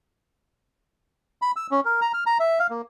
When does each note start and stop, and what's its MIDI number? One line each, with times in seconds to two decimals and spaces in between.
1.42 1.51 83
1.56 1.67 88
1.71 1.80 61
1.85 2.00 70
2.01 2.12 82
2.14 2.24 89
2.26 2.38 82
2.40 2.59 76
2.59 2.67 77
2.70 2.82 58